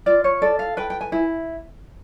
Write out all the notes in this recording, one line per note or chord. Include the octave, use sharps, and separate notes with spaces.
F4 D5
C#5
A4 D5
F5
B4 G5
G5
G#5
E4